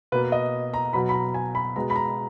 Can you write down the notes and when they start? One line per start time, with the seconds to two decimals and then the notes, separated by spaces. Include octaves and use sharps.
0.12 B2 A#3 B4
0.32 D#5
0.74 A#5
0.93 B2 F#3 B3 B5
1.09 B5
1.14 A#5
1.34 G#5
1.55 B5
1.76 B2 G#3 B3 A#5
1.90 B5
1.96 A#5